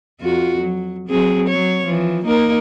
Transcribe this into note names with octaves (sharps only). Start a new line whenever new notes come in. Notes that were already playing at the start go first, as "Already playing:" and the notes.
F2 F4 F#4
F#3
F#3 C4 G#4
F#3 C#5
E3 F3
A#3 D#4 A#4